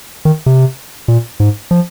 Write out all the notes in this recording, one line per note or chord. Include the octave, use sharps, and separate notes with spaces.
D#3
C3
A#2
G#2
F3